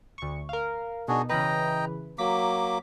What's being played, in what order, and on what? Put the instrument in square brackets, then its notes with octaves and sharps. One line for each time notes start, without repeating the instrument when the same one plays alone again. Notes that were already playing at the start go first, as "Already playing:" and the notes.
[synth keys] D2 C#6
A#4 F5
[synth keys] B2 D#4 [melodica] D4 F#4 G#4
[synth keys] C#3 E3 B4 [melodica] D#5 G5 A#5
[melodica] F#3 A#3 D6 [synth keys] B6